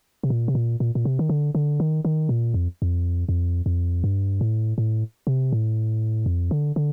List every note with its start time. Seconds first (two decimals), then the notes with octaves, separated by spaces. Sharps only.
0.23 C3
0.30 A#2
0.48 C3
0.55 A#2
0.80 A#2
0.95 A#2
1.05 C3
1.19 D#3
1.29 D3
1.55 D3
1.80 D#3
2.05 D#3
2.29 A#2
2.54 F2
2.82 F2
3.29 F2
3.66 F2
4.04 G2
4.41 A2
4.78 A2
5.27 C3
5.53 A2
6.26 F2
6.51 D3
6.76 D3